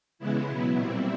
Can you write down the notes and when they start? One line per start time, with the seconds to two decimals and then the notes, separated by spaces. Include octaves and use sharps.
0.19 C#3 E3 G#3 B3 E4
0.47 B2 F#3 B3
0.76 A#2 G3 C4 E4